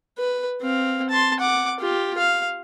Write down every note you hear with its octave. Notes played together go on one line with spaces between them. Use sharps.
B4
C4 F5
A5 C6
F#5 D6
F4 G4
F5